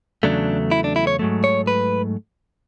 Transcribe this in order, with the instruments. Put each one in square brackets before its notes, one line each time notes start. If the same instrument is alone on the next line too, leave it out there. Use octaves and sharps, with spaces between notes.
[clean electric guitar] E2 C#3 F#3 A3 D4
E4
D4
E4
C#5
G#2 F#3 A3
C#5
B4